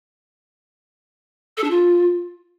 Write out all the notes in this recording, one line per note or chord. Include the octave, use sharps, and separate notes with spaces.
A4
D4
F4